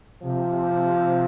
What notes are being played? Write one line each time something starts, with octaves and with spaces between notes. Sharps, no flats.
C3 F3